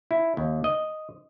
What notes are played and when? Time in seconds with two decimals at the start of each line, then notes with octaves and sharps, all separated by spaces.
0.11 E4
0.37 D#2
0.64 D#5